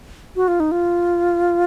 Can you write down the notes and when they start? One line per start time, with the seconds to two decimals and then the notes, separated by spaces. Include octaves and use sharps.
0.36 F#4
0.48 F4
0.60 D#4
0.72 F4